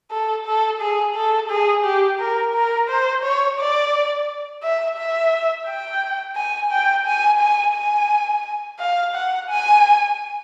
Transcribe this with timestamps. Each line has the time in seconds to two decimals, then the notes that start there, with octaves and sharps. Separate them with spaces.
0.11 A4
0.46 A4
0.81 G#4
1.15 A4
1.50 G#4
1.85 G4
2.19 A#4
2.55 A#4
2.89 C5
3.23 C#5
3.59 D5
4.63 E5
4.98 E5
5.67 G5
6.36 G#5
6.71 G5
7.06 G#5
7.40 G#5
7.75 G#5
8.79 F5
9.15 F#5
9.49 G#5